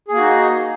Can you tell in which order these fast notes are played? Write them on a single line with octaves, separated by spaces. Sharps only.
G#4 A#3 F#4 D#4